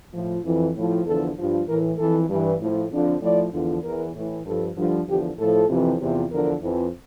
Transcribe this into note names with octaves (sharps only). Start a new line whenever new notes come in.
A2 F3 F4
F2 E3
A2 F3
E2 D3 F3 A4
G2 F3
A2 E3 A#4
F2 E3 A4
G2 E3
A2 F3
F2 D3 F3
A2 F3 D5
E2 D3 F3
E2 E3 A#4
A2 E3
G2 F3 A4
G2 D3 F3
E2 D3 F3 G4
A2 F3 A4
F2 C3 E3
E2 C3 F3
E2 D3 F3 A#4
F2 E3